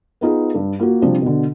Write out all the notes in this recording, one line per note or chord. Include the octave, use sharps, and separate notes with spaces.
B3 D#4 F4 G#4
G2
A#3 F4 F#4
C3 F3 G3 D4
B2 D3